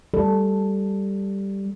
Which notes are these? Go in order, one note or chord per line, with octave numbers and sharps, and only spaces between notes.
G3 A4